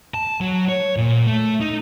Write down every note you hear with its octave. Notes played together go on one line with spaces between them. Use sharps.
A5
F#3
C#5
A#2
A3
D#4